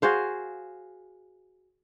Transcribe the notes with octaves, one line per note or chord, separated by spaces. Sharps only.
F#4 G#4 C5 F5